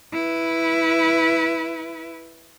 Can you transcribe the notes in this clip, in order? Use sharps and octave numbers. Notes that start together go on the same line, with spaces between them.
E4 B4